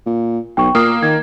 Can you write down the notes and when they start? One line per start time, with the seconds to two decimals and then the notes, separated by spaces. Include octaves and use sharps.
0.06 A#2
0.57 B1 G5 C#6
0.75 A#2 A#3 D#6 F6 C7
1.03 D#3 G#6